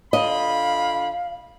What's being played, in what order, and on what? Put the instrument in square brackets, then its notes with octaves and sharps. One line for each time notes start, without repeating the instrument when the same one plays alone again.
[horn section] D3 F4 B5 [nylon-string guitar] D#5 [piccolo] F5